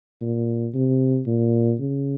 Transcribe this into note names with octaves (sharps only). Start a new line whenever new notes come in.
A#2
C3
A#2
C#3